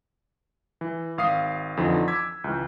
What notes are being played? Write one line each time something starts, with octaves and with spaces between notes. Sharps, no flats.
E3
G#1 F5 D#6 C7
F2 D3 E3 F3 D#4
D6 E6 G#6 B6
C#2 E3